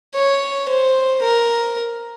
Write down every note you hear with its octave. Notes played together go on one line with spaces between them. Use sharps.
C#5
C5
A#4